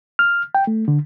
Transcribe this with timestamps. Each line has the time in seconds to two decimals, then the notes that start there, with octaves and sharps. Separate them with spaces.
0.19 F6
0.55 G5
0.67 A3
0.88 D3